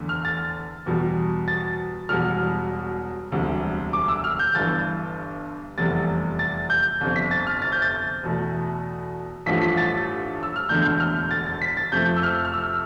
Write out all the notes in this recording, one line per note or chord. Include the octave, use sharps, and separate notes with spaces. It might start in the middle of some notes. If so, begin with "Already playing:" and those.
Already playing: E2 D3 A3
F6
A6
E2 B2 G3
A6
E1 E2 B2 G3 F6
E1 D2 C3 G3
D6
E6
F6
G6
G1 G2 E3 A6
F1 E2 C3 G3 A6
A6
G6
G1 F2 C3
B6
A6
F6
A6
G6
A6
E2 B2 A3
A1 G2 F3 A3 B6
B6
A6
E6
F6
E1 E2 D3 A3 G6
G6
F6
A6
A6
B6
A6
F2 C3 F3 A3 G6
E6
F6
F6
E6